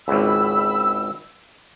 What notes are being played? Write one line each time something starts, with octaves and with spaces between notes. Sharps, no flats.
G#1 C#2 B5 E6